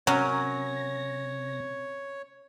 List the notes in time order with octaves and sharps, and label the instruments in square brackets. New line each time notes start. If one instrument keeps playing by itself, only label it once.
[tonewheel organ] C3 A#6 [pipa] F#3 [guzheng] C#4 A#4 [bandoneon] C#5